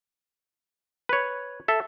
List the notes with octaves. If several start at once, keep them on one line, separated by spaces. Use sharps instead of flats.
B4 C#5
A4 E5